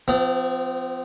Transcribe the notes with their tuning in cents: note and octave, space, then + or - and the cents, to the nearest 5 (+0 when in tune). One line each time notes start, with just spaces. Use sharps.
F3 +0 C4 -40